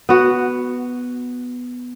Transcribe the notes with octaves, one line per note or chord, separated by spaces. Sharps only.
B3 F#4